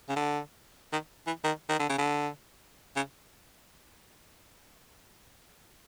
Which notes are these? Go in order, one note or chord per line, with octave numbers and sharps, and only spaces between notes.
C#3
D3
D#3
E3
D#3
D#3
D3
C#3
D3
C#3